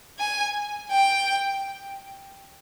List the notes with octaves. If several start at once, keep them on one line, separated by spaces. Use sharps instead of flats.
G#5
G5